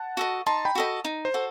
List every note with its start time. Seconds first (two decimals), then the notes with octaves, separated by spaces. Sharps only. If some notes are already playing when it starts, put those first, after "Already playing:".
Already playing: F#5 A5
0.17 F#4 A4 D#5
0.46 D#4 A5 C6
0.65 G5 B5
0.75 F#4 A4 D#5
1.05 D#4
1.25 C5
1.34 F#4 A4